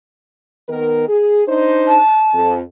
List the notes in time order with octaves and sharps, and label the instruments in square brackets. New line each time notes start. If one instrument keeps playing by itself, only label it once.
[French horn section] D#3 B3 A#4
G#4
D4 D#4 C5
[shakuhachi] A5
[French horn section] F2